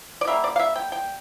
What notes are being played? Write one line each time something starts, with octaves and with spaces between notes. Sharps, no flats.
D5
D3 G3 A#3 E5
D5
F5
E5
G5
G5